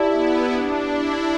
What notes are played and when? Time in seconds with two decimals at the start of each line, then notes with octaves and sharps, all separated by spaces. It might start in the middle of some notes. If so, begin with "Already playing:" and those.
Already playing: E4 G4 D5 A5
0.13 B3
0.52 D4
0.91 E4